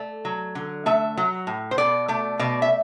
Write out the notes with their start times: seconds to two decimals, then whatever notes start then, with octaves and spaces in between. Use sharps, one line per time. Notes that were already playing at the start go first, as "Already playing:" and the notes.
Already playing: A3 D5
0.25 F#3
0.55 D3
0.86 A3 E5
1.17 F#3
1.47 A2
1.71 C5
1.78 B2 D5
2.08 A3 D5
2.39 B2 D5
2.62 E5